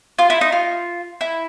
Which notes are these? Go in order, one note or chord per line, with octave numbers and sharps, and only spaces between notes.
F4
E4
D#4
F4
E4